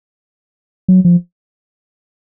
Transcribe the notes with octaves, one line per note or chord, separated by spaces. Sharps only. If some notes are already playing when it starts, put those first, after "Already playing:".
F#3
F3